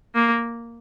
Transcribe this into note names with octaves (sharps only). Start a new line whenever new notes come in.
A#3